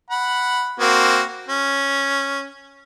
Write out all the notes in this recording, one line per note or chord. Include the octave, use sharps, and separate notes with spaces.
F#5 B5
A#3 C4 F#4
C#4